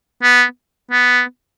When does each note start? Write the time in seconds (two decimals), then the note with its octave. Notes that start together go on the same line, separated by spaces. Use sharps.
0.23 B3
0.91 B3